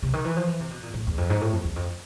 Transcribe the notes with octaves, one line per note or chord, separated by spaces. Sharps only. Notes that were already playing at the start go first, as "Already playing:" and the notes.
C3
D#3
E3
F3
E3
C3
B2
A#2
A2
E2
F2
G#2
A2
F2
E2
F2